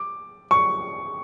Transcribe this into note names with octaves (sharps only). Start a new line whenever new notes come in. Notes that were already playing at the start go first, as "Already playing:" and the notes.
Already playing: D6
C#6